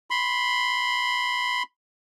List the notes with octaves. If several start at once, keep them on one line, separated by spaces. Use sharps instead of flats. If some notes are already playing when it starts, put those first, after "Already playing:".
B5 C6